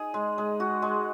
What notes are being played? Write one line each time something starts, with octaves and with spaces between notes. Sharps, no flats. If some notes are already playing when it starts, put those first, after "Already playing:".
Already playing: D#4 G#4
G#3
G#3
F#4
G#3